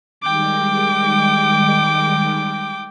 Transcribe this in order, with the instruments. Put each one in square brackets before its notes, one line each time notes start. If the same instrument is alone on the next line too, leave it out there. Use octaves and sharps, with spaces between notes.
[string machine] D#3 G3 G#3 [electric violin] G5 D6